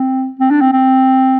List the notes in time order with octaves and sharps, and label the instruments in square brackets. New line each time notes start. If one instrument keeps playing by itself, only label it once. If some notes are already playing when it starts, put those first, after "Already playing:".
Already playing: [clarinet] C4
C4
D4
C4
C4